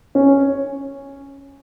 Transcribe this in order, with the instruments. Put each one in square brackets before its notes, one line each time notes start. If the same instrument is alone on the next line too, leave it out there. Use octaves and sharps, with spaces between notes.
[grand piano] C#4